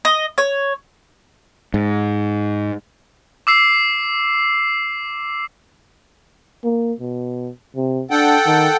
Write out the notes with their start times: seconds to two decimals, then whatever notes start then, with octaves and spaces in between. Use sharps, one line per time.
0.05 D#5
0.38 C#5
1.74 G#2
3.47 D6 E6 C7
6.64 A#3
7.00 B2
7.76 C3
8.11 D4 A4 F#5 G5
8.46 D#3